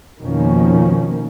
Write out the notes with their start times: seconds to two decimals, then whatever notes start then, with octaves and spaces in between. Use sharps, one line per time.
0.21 F2 B2 D#3 F3 A#3 C#4